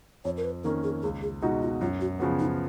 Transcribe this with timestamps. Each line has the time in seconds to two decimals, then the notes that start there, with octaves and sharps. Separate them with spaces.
0.25 F2 C#5
0.37 A#4
0.44 B4
0.64 D#3 A#3 C#4 A#4
0.83 G#4
1.02 C#2 G#4
1.22 G#4
1.42 B2 G#3 D#4 F4 F#4
1.62 F4
1.81 F#2 F4
2.01 F#4
2.19 C#3 F3 B3 F#4
2.39 D#4